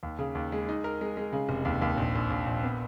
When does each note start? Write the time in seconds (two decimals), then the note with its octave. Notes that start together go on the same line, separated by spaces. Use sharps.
0.03 D#2
0.19 C#3
0.35 D#2
0.52 G#3
0.69 D#4
0.84 A#4
1.01 G#3
1.17 G#3
1.32 C#3
1.49 F1
1.65 D#2
1.82 D#2
1.98 A#1
2.15 A#1
2.30 A#1
2.46 A#1
2.64 B3